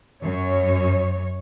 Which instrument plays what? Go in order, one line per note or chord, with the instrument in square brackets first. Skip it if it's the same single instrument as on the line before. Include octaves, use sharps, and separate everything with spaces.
[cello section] F#2 C#5